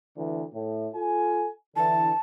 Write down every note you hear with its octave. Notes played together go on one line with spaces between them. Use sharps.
D2 E3
A2
F4 A4 G#5
D3 E3 A5